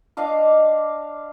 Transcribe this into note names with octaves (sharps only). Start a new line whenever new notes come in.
D4 D#5 F5 D6